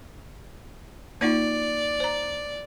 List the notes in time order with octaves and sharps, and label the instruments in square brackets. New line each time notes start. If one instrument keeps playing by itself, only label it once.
[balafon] A#3 D#4 F4 [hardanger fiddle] D5
[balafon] C5 A#5